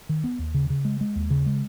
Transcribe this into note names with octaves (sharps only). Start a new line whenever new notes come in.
D#3
B3
D#2
C#3
C#3
G#3
G#3
D#2
C#3
G#3